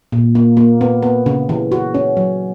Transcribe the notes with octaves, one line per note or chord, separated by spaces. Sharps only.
A#2
A#3
A#3
B3
B3
C#3
E3
F#4
C#4
F#3